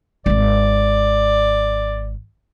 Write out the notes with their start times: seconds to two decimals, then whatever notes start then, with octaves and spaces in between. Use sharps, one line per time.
0.26 D#1 G#1 D5